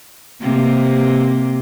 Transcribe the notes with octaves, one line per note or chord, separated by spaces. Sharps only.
C3 A#3 C4